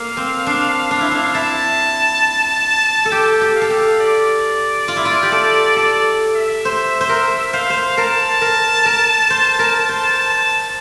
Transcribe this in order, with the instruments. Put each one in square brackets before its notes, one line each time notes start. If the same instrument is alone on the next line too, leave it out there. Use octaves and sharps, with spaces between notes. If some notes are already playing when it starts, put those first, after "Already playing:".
Already playing: [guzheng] A#3 [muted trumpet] F5
[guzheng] C4
D4
D4
E4
D4
[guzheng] E4 [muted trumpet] A5
[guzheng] A4
[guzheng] G4 [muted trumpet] G5
[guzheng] G4
[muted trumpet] F5
[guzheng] A4
G4
[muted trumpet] D5
[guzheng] F4
E4
F4
G4
A4
[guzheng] A4 [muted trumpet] D5
[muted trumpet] E5
[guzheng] C5
C5
A#4
[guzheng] C5 [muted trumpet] F5
[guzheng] C5
[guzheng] A#4 [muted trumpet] A5
[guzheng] A#4
A#4
C5
A#4
C5
[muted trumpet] A5